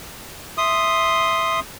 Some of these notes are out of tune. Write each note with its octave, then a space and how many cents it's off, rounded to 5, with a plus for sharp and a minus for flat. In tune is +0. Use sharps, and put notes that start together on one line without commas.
E5 +0 C6 +0 D#6 +0